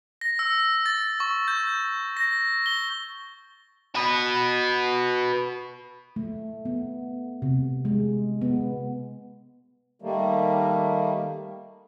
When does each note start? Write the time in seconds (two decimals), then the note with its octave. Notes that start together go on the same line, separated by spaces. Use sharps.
0.21 A#6
0.39 E6
0.86 A6
1.20 C#6
1.48 G6
2.17 A#6
2.66 G7
3.95 F#4 B4
6.16 A3
6.65 B3
7.42 C3
7.85 G#3
8.42 B3
10.02 D#3 G3 A3 A#3